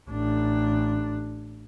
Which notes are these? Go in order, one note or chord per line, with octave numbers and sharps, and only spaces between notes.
A1 D4